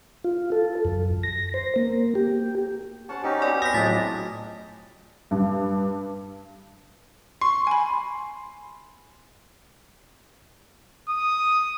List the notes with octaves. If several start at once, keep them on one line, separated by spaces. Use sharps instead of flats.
F4
A4
F#2
A#6
C5
A#3
G4
C#4 C5 F#5 A5
F#3 C#4 D#4 G4
B3 C4 D5 G#5
C#4 D#6 A#6 B6
A2 F3 F#3 G#3 D6 A6
D4
G2
C6 C#6
G#5 B5
D#6